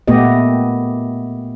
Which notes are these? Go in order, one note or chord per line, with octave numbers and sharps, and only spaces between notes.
A#2 A3 B3 G4 D#5